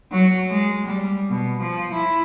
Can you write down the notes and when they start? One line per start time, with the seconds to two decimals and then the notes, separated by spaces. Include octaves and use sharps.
0.12 F#3
0.50 G#3
0.86 G3
1.30 B2
1.61 F3
1.93 E4